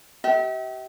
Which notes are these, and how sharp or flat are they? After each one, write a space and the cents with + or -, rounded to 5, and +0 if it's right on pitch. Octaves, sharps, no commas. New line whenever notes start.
G4 -35 E5 -40